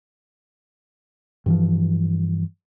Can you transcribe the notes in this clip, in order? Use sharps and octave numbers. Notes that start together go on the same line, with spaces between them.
G2 E3 F3